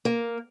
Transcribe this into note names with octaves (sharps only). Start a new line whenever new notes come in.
A#3